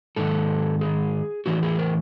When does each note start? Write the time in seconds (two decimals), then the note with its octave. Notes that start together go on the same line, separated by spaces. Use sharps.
0.16 G#2 D#3 A4
0.81 G#4
1.46 A2 E3 F#4
1.63 G#4
1.79 A#4